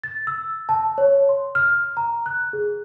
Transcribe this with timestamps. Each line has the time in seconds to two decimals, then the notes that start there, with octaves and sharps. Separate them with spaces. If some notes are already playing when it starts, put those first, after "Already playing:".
0.04 A6
0.27 E6
0.69 A5
0.98 C#5
1.29 C6
1.55 F6
1.97 A#5
2.26 F#6
2.53 G#4